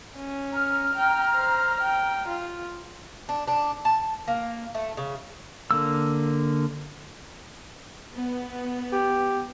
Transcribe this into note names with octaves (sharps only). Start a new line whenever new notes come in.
C#4
A#5 F6
G5
C5
G5
F4
D4
D4
A5
A#3
A3
C#3
D3 A#3 E6
B3
G4